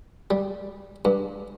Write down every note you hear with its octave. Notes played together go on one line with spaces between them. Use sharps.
G3
G2